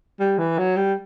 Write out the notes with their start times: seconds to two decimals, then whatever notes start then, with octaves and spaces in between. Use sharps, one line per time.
0.20 G3
0.38 E3
0.58 F#3
0.76 G3